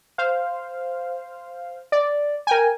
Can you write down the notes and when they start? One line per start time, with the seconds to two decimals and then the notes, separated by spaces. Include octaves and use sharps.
0.18 C5 F5
1.92 D5
2.47 A#4 G5 G#5